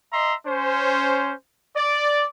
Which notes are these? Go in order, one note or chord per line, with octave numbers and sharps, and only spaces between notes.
D#5 E5 A#5 C6
C#4 C5
D5